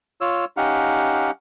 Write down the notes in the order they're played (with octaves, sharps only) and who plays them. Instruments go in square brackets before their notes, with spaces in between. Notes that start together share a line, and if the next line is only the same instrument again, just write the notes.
[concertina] F4 C#5 E6
C#4 D#4 G4 F5 F#5